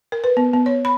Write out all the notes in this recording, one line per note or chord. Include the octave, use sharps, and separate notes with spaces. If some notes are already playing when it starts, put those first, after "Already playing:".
A#4
B4
B3
B3
C#5
B5